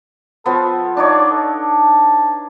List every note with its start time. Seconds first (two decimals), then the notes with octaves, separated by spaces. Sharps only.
0.46 F3 B3 A4
0.97 D4 D#4 C#5 D5
1.31 A4
1.62 A5